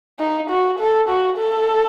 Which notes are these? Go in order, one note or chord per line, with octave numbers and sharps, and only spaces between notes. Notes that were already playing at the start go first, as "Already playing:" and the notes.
D#4
F#4
A4
F#4
A4